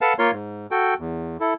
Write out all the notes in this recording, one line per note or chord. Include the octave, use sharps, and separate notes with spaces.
A4 B4 F5 F#5 A5
A#3 F4 A#4 C#5 C6
G#2
F#4 A4 G5
E2
E4 A4